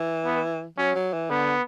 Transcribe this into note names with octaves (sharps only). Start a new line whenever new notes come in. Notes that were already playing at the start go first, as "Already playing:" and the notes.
Already playing: E3
B3
F#3 C#4
F#3
E3
D3 B3